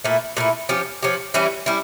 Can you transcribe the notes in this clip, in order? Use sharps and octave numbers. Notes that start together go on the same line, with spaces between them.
A#2 A3 E4
A#2 A3 E4
F3 C#4 G4
F3 C#4 G4
E3 G3 C#4 E4
G3 C#4 E4